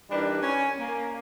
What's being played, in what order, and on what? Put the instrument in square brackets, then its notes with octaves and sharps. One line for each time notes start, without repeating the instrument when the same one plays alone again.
[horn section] E3 G3 D4 D#4 A#4 B4
C#4 G#5
A#3